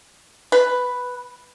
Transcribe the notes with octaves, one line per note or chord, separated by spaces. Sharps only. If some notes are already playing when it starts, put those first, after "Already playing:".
B4